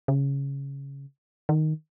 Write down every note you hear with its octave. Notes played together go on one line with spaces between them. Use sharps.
C#3
D#3